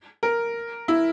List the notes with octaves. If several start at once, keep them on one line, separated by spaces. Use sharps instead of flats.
A#4
E4